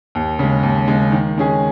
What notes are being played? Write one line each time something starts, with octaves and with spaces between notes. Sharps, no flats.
D#2
C#3 G#3
D#2
C#3 G#3
D#3
G#3 C#4 G#4